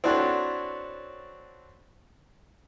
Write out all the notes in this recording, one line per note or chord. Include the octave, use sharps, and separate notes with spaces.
C4 D4 E4 F#4 A4 C#5